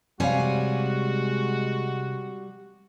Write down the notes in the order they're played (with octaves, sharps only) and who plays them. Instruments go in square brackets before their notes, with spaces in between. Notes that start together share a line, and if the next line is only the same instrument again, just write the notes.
[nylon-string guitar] C3 C#5 F5 [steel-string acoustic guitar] G3 G#5 [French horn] G#3 [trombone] F#4